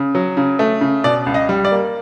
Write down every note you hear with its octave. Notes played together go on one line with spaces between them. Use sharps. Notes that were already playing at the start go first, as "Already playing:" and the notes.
Already playing: C#3
F#3
C#3
A3
C#3
B2 D5
C#2
D#5
G3
D5
A#3